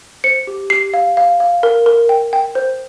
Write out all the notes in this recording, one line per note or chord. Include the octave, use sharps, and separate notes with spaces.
C5 C#7
G4
G4 C7
F5
F5
F5
A#4
A#4
G5
G5
C5